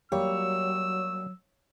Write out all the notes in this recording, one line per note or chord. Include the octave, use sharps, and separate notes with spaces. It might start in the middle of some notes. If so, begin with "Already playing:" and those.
F#3 G3 A#3 G4 C#5 E6